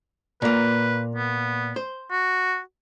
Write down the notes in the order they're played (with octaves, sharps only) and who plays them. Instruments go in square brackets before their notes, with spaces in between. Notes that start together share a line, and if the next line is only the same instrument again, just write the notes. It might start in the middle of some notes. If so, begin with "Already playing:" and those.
[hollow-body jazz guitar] A#2 A#3 [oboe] B4
[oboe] B3
[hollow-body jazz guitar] C5
[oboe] F#4